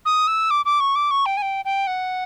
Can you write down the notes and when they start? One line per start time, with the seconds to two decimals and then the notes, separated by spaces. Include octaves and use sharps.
0.05 D#6
0.27 E6
0.50 D6
0.65 D6
0.80 C#6
0.95 D6
1.11 C#6
1.26 G5
1.37 G#5
1.42 G5
1.65 G5
1.87 F#5